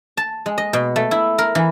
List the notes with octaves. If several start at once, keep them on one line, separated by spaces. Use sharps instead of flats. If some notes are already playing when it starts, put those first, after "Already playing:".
A5
G#3
D#5
B2
A3
E4
A#4
E3